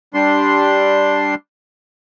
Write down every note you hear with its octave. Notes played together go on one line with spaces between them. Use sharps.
G3 D4 C6